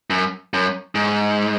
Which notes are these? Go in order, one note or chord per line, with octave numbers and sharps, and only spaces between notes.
F#2
F#2
G#2